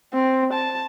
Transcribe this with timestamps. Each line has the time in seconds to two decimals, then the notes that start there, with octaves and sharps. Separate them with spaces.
0.14 C4
0.53 A5